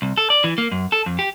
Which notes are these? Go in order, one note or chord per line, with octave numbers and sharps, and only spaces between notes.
C2
A4
D5
E3
A#3
F#2
A4
F2
G4